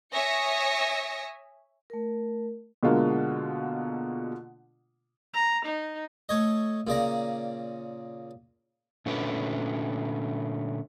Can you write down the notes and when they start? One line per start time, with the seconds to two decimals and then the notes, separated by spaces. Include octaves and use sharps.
0.13 C#5 E5 G#5 D#6 A#6 C#7
1.90 A3 A#4
2.83 B2 D3 G#3 A#3 F4
5.34 A#5
5.66 D#4
6.29 A3 C#5 D#5
6.87 A#2 C#3 D5 A#5
9.06 A#2 D3 A3 C#4 D4 B4